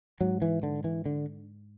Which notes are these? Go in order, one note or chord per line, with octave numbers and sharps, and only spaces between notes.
G#2 F#3
E3
D3
E3
D3